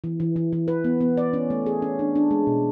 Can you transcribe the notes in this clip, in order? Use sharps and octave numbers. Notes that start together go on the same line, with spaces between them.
E3
E3
E3
E3
B4
B3
B3
D5
C#4
A3
G#4
C#4
D4
D4
G#3
B2